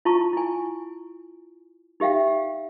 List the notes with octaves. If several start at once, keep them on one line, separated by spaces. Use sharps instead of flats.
E4 F4 A5 C#6
E4 G#5
D#4 G4 E5 F5 G5